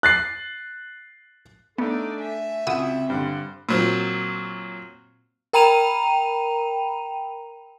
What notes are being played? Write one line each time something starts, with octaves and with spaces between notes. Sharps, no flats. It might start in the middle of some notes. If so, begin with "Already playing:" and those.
F#6 A6 C7
A3 B3 D4 D#4 A4 D5
E5 G#5
C#2 C4 F#4 D#6 E6
G2 D3 C5
A#2 F#3 C4
A#4 G5 A#5 B5 D#7 F7